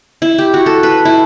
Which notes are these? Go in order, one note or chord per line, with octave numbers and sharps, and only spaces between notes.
E4
G4
F#4
A4
B4
E4